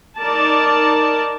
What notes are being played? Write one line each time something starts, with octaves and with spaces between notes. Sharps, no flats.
D#4 A#4 D5 A5